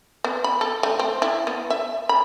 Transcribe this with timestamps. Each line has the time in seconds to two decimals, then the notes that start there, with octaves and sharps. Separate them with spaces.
0.24 B3
0.44 B5
0.61 A4
0.83 A3
0.99 C4
1.22 E4
1.47 B3
1.70 E5
2.09 B5